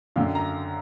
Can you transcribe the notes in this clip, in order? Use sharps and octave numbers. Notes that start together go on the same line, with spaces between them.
F#2 D3 F5 G5
A#5